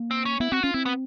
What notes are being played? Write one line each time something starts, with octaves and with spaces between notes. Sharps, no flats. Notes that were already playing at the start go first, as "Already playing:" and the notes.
Already playing: A#3
C4
C#4
B3 E4
C4 F#4
C#4 F4
C4 E4
B3